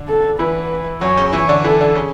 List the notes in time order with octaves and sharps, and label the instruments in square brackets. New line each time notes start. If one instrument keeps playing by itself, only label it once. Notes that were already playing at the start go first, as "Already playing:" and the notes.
Already playing: [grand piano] D3 D4
[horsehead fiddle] A4
[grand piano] E3 E4 [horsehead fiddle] B4
[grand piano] F#2 F#3 [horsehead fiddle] C#5
[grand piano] C#3 C#4
[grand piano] E3 E4 [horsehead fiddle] C#5
[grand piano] D3 D4
[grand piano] E3 E4 [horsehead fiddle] A4
[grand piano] D3 D4
C#3 C#4